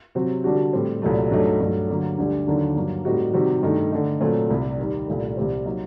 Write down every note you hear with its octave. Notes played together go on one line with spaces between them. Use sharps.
C3 F#3 C4 F#4
D3 G3 D4 F#4
A2 G3 C4
C2 A#2 F#3 A3
G2 F#3 A3 D#4
G2 F#3 A3
D3 F#3 A#3
D2 D3 G3
D#2 D3 F#3 A#3 D4
G2 F#3 A#3
A2 G3 C4 D#4 F#4
C3 D#3 G3 C4 F#4
G2 D#3 A3 D#4
D3 A3 D#4
A#2 F#3 A3 C4
C2 C3 G3
D#2 D#3 G3
C2 A#2 A3
C2 C3 G3 C4
F#3 A#3 D#4